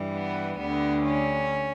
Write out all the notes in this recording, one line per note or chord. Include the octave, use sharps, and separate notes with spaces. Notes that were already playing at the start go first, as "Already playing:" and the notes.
Already playing: G2 E3 G3
B3
D2 D3 G3 B3
C#4